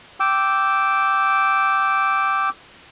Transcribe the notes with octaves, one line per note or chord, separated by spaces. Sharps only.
G5 D6 E6